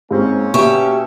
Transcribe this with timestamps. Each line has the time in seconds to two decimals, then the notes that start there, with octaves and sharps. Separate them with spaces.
0.11 G#2 A#3 C4 C#4
0.54 B2 G4 E5 C#6